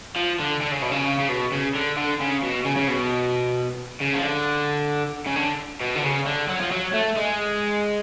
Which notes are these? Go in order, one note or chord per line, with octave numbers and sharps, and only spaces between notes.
F3
D3
D3
C#3
B2
C#3
C#3
B2
C#3
D3
D3
C#3
B2
C#3
C#3
B2
C#3
F3
D3
C#3
D3
B2
D3
C#3
D3
F#3
F3
F#3
A3
G#3